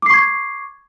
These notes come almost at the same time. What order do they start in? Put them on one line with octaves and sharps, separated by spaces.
D6 C7 C#6 G#6